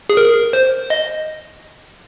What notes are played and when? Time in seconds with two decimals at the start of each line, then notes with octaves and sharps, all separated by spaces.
0.10 G#4
0.17 A#4
0.53 C5
0.90 D#5